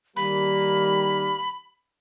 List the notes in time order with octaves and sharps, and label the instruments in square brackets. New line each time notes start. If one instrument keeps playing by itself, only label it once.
[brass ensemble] D#3 G3 A#3 [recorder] B5